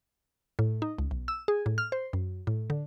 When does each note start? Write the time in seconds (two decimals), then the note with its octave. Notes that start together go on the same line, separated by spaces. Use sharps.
0.59 A2
0.82 D#4
0.98 C#2
1.11 B1
1.28 E6
1.48 G#4
1.66 A2
1.78 F6
1.92 C5
2.13 F#2
2.47 A2
2.70 D3